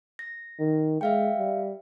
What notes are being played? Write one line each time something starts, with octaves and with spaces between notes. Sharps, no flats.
A#6
D#3
G#3 E5 F5 G5
G3